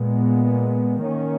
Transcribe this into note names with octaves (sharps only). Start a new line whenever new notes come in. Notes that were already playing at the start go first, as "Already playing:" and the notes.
Already playing: A#2 G#3 B3
D#3 A#3 C#4